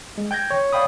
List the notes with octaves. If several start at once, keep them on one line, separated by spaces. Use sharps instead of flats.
G#3
G5 G6 G#6 A#6
C#5
C#5 D5 F5 G5 B5 D#6